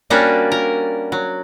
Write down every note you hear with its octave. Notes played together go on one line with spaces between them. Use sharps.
G3 A#3 C#4 D4 F#4
A#4
F#3